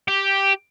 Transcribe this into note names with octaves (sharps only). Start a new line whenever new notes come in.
G4